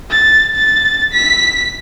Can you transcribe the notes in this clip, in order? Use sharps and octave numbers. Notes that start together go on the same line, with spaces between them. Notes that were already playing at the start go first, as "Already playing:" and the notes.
A6
A6
B6